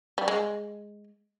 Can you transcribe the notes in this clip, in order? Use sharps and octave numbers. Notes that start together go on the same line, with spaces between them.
G3
G#3